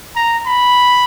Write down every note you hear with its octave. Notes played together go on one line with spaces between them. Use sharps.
A#5
B5